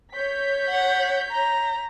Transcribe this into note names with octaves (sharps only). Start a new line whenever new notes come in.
C#5 G6 B6
F#5
A#5